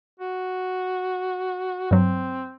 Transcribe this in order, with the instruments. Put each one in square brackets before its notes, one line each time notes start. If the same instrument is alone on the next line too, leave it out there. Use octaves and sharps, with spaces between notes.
[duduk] F#4
[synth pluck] G2 F#3 [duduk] C4